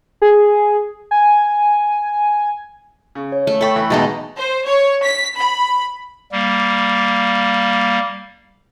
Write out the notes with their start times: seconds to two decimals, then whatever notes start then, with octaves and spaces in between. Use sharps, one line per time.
0.22 G#4
1.11 G#5
3.15 C#3
3.32 C#5
3.47 A3
3.61 A3 A4 E5 G5 B5 C#6
3.76 E3
3.90 E2 B2 G#3 D#4 A5 A#5
4.36 C5
4.65 C#5
5.04 B6
5.38 B5
6.32 G3 A#3